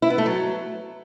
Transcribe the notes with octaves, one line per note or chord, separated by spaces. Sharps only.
E4
B3
A3
F#3